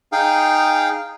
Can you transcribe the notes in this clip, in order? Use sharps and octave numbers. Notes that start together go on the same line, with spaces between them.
D#4 G#4 F5 G5